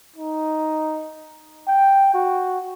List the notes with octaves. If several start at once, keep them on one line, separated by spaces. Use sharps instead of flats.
D#4
G5
F#4